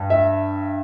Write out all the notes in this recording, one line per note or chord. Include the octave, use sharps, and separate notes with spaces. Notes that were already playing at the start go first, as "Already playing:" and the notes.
Already playing: G2
E5